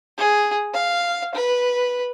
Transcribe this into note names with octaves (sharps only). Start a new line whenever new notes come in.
G#4
F5
B4